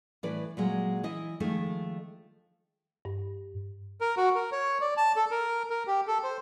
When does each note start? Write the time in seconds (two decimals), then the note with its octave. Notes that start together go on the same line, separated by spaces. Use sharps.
0.23 A2 E3 B4 D5
0.57 A#2 F#3 G#3
1.03 E3 E4 D#5
1.40 D#3 F3 G#3 A3 D#4
3.05 G2
4.01 A#4
4.17 F#4
4.35 A#4
4.52 C#5
4.81 D5
4.97 A5
5.16 A4
5.31 A#4
5.70 A#4
5.87 G4
6.07 A4
6.23 C5